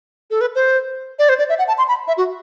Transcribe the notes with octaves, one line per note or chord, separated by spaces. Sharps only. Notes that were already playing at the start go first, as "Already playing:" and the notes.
A4
B4
C5
D5
C5
D5
E5
F#5
A5
C6
B5
E5
F#4